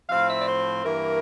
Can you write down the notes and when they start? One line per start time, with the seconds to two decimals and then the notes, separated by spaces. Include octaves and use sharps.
0.09 A2 F3 C4 F5
0.28 E5
0.40 D5
0.47 C5
0.84 G2 E3 A#3 A#4